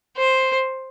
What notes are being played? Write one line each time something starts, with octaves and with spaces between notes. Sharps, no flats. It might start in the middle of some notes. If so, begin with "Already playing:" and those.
C5